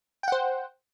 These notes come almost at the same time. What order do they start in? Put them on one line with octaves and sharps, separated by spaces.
G5 F#5 C5